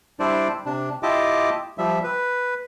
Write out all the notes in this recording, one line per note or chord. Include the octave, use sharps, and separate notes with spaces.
G3 D4 E4 C5 D5
C3 D4
E4 F4 G4 D#5 A5 D6
F3 G3 E5
B4